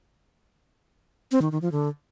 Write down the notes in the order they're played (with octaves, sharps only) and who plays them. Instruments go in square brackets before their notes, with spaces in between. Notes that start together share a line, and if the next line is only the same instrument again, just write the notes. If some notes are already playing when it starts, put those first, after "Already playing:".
[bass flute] C4
D#3
D#3
F3
D3